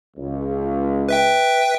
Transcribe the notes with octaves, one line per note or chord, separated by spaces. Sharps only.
C#2
B4 E5 G5